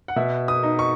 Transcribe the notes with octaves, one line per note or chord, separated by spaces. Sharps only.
F#5
B2 E5
D#6
D#4
C#6